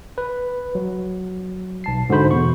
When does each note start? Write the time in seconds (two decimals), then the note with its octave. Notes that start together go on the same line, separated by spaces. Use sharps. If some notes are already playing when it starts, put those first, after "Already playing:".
0.18 B4
0.75 F#3
1.84 B1 A5 C7
2.10 G#2 D3 F#4 C5 B5
2.31 E2 B2 C#6